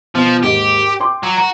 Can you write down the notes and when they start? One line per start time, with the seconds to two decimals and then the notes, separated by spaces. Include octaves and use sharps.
0.15 B2 F3
0.43 D#2 G#2 G4
1.00 G5 C6 D6
1.23 F#3
1.37 F#4 A#5